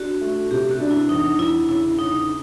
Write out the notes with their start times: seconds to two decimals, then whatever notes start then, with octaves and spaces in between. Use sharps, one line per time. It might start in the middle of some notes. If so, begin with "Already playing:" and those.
Already playing: D4 F#4
0.21 A3
0.51 C3 G4
0.71 F#4
0.80 D4
0.91 E4
1.09 E2 D#4
1.39 E2 E4
1.68 C#3 E4
1.98 C#3 D#4